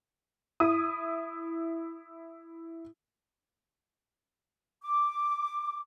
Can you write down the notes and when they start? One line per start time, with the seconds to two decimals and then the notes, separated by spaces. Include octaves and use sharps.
0.60 E4 D#6
4.82 D6